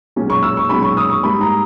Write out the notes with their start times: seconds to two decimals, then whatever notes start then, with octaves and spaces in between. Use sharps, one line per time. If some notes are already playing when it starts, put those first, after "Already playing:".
0.16 B1 A#2 G#3 C#4
0.30 C#6
0.43 E6
0.57 C#6
0.69 B1 A#2 G#3 C#4 B5
0.83 C#6
0.97 D#6
1.10 C#6
1.23 G#2 G3 A#3 B5
1.41 A#5